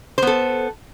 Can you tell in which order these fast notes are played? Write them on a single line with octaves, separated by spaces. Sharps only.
C5 B3 A4